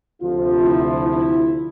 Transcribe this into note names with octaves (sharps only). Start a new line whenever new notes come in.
D2 C3 F3 F4
E4
E4